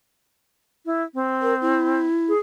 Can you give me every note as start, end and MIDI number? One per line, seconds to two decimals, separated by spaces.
0.86 1.03 64
1.14 2.05 60
1.42 1.54 70
1.61 2.32 64
2.28 2.39 68